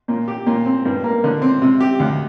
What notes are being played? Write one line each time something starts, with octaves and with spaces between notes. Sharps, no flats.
A#2
G4
A#2
C4
G2
A#3
D3
C4
C3
G4
D2